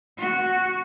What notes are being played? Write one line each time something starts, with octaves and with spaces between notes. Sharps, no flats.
F#4